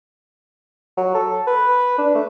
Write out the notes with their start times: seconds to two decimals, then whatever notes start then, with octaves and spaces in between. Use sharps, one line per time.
0.97 F#3
1.14 A4
1.47 B4
1.98 D4
2.15 A3